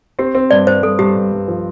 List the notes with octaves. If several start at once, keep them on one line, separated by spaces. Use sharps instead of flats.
C4 G4
C4
G2 D5
G2 C5
G2 A4
G2 G4
G2
G2
F3